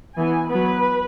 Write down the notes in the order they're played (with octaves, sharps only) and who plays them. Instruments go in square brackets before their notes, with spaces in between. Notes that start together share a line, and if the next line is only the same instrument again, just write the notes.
[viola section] E3 B3 G#5
F#3 B3 B4